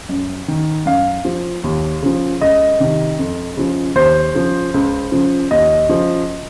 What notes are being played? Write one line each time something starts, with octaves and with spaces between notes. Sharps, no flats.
F#2
D#3
F#2 F5
F3
D#2
C#3 F3
C#2 D#5
C3 D#3
F2
C#3 F3
D#2 C5
C#3 F3
C#2
C#3 F3
D#2 D#5
C#3 F3